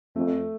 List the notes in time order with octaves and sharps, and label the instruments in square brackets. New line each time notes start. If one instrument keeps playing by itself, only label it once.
[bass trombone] F2 [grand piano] A3